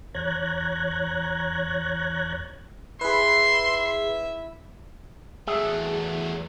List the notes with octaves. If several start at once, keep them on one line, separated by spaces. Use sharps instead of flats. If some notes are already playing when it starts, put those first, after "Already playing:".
E2 C#5 A#5 F#6 G#6
E4 G#4 B4 E5 C6
E2 F#3 A3 G#4 E5